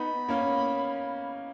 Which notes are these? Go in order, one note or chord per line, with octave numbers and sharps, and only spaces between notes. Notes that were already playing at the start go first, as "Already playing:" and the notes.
Already playing: B3 D#4 B5
A#3 C#4